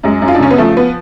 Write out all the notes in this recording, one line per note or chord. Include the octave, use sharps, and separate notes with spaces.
F#2 G#3
F#2
F4
D4
C#3 C#4
B3
F3 A3
B3